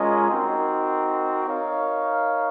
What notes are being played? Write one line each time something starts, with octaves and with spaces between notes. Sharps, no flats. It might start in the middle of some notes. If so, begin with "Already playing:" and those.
Already playing: G#3 C#4 F4 A#4 D#5
C4 D#4 F#4 A#4
D#4 A#4 C#5 F5